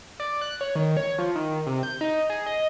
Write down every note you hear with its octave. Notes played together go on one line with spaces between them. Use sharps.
D5
F#6
C#5
D#3
C#5
F3
D#3
C3
G6
D#4
G#4
D#5